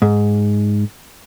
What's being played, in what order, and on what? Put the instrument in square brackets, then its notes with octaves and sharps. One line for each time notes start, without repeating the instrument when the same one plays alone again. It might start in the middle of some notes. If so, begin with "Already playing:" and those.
[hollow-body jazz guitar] G#2